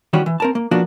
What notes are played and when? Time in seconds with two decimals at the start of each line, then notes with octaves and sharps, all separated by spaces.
0.13 D#3 E3 G3 C#4 F#4 G4
0.26 E3
0.40 C4 A#4 A5
0.55 A#3
0.71 F3 A#3 B3 D4 F4 F#4